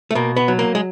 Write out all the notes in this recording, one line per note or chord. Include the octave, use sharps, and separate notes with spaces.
A3
B2 A#3
B3
F#3
A#3
G#3